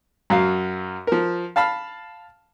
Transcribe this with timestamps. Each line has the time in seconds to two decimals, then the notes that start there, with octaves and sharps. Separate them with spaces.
0.30 F#2 F#3 F5
1.07 F3 A#4
1.56 F5 A5 B5 F6